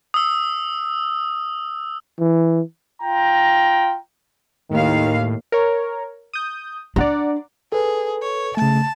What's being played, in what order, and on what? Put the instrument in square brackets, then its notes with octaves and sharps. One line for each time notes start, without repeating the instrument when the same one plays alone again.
[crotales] D#6 E6
[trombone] E3
[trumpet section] F4 G5 A#5
[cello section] D#2 F5 [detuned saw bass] A2 [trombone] D#3
[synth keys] A#4 C#5
D#6 G6
[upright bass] D4 [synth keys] D5 F#5 A#5
[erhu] G#4 [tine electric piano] A4 B4
[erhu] C#5
[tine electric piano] C#3 A3 [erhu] A5